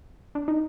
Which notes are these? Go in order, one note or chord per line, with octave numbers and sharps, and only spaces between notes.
D4
D#4